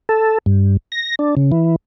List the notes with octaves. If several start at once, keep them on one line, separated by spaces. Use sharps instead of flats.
A4
G2
A#6
D4
C#3
E3